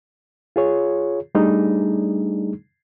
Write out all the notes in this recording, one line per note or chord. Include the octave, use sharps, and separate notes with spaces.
F4 G#4 C#5
G3 A3 D4 D#4 G#4